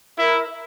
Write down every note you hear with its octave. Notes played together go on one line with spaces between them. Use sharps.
E4 A#4
E5